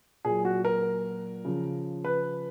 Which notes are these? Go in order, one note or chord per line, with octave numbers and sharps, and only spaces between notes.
A#2 F#3 G#4
F#4
A#4
C#3 F3
B4